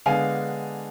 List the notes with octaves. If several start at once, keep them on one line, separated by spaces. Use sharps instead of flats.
D3 G#3 B3 D4 F5 G#5